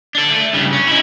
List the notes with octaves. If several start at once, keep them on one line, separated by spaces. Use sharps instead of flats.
D4 A4
A3
G2 C#3
C#4
D#4 E4